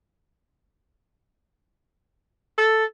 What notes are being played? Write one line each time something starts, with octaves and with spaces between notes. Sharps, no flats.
A4